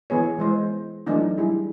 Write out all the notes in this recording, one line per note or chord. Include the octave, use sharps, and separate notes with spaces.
E3 B3 G#4 C#5
E3 G#3 C5
E3 F#3 A3 D4 D#4
G3 E4 G#4